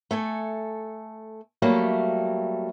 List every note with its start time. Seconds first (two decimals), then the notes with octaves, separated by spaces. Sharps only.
0.11 A3 A4 G#5
1.62 F#3 G3 A3 A#3